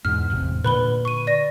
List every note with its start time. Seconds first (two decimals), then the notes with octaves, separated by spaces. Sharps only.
0.05 E2 G#2 B2 F6
0.30 E1 A1 C3
0.64 A#2 D3 B4 B5 G7
1.05 C#6 D#7
1.27 D5 A#6